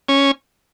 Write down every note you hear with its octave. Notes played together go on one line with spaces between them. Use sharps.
C#4